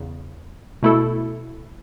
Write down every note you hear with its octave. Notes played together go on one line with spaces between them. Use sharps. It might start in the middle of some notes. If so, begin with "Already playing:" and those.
Already playing: E2 C#3
B2 A3 E4 A4